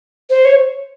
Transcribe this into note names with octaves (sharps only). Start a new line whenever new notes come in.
C5
C#5